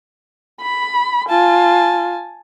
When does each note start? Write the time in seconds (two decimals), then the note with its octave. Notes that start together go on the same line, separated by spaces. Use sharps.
0.61 B5
1.29 F4 G#5 A5